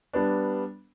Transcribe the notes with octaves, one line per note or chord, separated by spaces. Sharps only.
G3 B3 D4